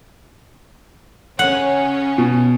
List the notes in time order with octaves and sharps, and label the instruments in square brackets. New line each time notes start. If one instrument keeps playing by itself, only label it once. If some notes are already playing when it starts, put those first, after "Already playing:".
[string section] C#3 C#4 [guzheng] F#5
[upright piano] B2